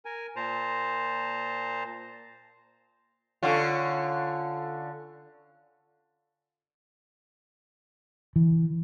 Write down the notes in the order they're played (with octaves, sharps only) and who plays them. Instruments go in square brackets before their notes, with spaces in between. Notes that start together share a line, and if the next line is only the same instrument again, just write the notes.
[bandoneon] A#4 G#5
A#2 C5 A5 A#5
[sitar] D3 C#4 F4
[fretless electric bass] E3